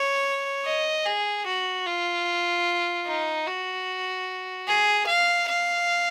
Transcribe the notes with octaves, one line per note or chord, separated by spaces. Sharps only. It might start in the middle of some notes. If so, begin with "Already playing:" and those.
Already playing: C#5
D#5
G#4
F#4
F4
D#4
F#4
G#4
F5
F5